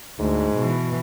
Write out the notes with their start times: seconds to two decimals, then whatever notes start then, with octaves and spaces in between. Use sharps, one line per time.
0.19 D2 G#2
0.57 B2 E3